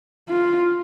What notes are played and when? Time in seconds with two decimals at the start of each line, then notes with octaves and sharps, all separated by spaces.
0.29 F4